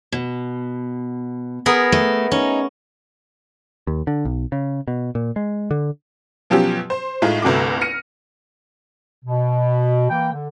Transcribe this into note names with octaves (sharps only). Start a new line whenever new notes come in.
B2
B3 G#4 A#4
A3
C#4 D#4
D#2
D3
B1
C#3
B2
A#2
G#3
D3
B2 F3 F#3 C#4 G4
C5
A2 G#3 D#4 F4
G1 C2 G2 A3 F#4 D6
F6 A#6 C#7 D#7
B2
E3 A#3 G5
D3